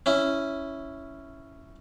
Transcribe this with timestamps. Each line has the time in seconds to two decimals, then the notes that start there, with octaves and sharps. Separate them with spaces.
0.06 C#4 E4